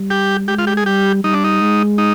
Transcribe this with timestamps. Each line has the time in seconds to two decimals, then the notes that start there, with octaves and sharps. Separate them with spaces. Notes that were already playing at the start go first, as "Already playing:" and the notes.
Already playing: G3
0.10 G4
0.48 G#3 G4
0.59 F4
0.67 G4
0.77 G#4
0.85 G3 G4
1.24 G3 D#4
1.34 D4
1.44 D#4
1.61 G#3
1.98 D#4